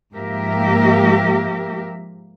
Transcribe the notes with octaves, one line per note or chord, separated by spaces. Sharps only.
G#2 F3 A#3 G4 A#4 E5